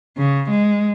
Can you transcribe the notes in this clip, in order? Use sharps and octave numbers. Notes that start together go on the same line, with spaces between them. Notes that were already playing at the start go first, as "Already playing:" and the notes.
C#3
G#3